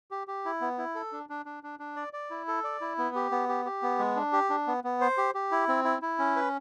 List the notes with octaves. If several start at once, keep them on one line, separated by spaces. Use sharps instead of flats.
G4
G4
E4
B3
E4
A4
D4
D4
D4
D4
D4
D5
D5
E4
A4
D5
E4
B3
G4
B3
G4
G4
B3
G#3
D4
G4
D4
B3
B3
C5
G4
G4
E4
C4
E4
E4
C#4
B4